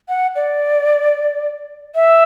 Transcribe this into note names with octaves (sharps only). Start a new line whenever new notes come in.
F#5
D5
E5